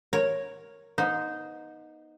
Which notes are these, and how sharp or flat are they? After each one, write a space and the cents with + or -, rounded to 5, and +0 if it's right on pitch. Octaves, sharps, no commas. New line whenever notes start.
A#4 +0 C#5 -5
B3 -35 D#4 +0 C5 -15